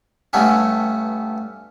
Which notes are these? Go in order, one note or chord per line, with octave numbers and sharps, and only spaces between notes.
G2 A3 B3 C#4